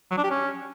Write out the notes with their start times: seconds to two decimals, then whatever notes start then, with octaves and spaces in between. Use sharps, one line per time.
0.11 F#3
0.17 D4
0.24 G4
0.30 C#4